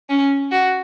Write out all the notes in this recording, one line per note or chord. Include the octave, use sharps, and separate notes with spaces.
C#4
F#4